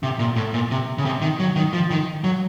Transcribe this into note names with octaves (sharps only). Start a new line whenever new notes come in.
C3
A#2
A2
A#2
C3
C#3
C3
D#3
F#3
D#3
F3
D#3
F#3